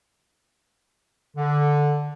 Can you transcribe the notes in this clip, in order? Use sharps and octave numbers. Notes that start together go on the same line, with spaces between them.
D3